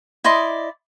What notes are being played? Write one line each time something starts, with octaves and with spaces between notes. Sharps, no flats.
E4 D5 D#5 C6